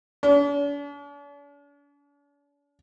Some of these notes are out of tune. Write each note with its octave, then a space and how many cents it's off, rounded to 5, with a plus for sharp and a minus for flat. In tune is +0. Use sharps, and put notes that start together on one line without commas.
D4 -45